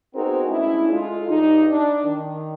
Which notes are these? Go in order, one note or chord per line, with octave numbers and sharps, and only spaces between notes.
B3 C4 D#4 F#4 G#4 A#4
G#3 A3 C#4 D4 E4
G#3 F4 A4
G2 D#4
D4
D#3